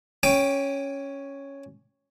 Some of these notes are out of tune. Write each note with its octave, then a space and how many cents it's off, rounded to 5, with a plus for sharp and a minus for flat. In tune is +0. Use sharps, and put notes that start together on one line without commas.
C#4 +0 G5 +20 D6 +0